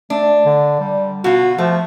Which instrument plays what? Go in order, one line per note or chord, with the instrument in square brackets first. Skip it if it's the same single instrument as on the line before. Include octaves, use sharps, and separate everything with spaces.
[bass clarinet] A3 [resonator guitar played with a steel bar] D4
[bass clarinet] D3
G3
[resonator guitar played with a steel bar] B2 F4 [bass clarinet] F#4
[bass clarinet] F3 [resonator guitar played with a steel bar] A3